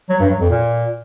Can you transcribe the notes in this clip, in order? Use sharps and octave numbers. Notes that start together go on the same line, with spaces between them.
F#3
G2
F#3
F2
A#2